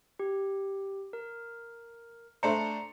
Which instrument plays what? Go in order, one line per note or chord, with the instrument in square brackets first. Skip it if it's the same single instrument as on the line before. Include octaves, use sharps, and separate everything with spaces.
[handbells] G4
A#4
[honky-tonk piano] A3 D4 C5 [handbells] A#5 C#7